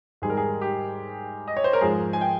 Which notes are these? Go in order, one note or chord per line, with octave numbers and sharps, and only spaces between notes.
G#2 D#3 G3 G#4
A#4
G#4
G4
D#5
C#5
C5
A#4
G#2 F3 G#3 G#4
G#5
G5